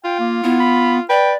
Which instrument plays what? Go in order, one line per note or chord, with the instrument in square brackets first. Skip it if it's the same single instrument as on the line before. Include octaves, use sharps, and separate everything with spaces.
[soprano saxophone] F4 [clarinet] G5
[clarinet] A#3
[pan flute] B3 [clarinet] E4
[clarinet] B5
[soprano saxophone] B4 [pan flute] D5 [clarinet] G5